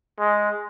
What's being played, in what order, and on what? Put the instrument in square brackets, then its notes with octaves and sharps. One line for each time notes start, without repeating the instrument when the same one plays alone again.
[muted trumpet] G#3